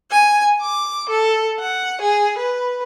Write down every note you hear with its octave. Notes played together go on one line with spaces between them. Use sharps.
G#5
D6
A4
F#5
G#4
B4